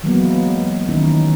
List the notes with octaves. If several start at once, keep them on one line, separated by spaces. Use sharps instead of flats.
E3 F#3 G#3 A#3 B3
D#3 E3 C#4 D#4 E4